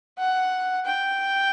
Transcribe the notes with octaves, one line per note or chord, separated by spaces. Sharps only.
F#5
G5